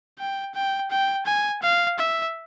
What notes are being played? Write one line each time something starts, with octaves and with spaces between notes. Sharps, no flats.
G5
G5
G5
G#5
F5
E5